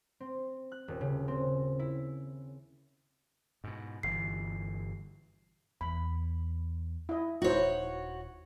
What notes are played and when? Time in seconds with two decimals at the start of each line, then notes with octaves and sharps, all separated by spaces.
0.20 C4
0.72 F#6
0.88 D#1
1.01 C#3
1.28 C4
1.79 E4
3.64 G#2 B2
4.03 G1 B2 E3 C7
5.81 E2 B5
7.09 E4 D#5
7.42 D#1 D#4 E4 F#4 C5 C#5